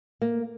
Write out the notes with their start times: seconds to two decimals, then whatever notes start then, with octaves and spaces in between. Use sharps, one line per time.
0.21 A#3